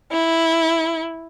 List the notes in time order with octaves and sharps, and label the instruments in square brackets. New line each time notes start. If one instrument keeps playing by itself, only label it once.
[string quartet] E4